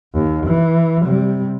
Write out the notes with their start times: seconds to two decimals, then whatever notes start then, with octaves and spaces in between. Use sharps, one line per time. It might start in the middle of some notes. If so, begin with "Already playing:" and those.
0.14 D#2
0.46 E3
1.02 C3 G3